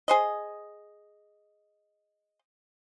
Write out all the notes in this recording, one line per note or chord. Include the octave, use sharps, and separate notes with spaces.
G#4 C5 D#5